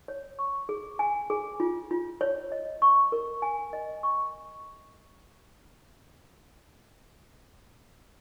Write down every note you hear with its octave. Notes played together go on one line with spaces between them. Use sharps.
C#5
C#6
G#4
G#5
G#4
F4
F4
C#5
D#5
C#6
A#4
G#5
D#5
C#6